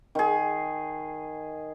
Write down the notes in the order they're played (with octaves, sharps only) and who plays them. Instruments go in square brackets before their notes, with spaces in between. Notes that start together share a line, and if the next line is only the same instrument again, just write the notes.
[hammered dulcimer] D#3 G#4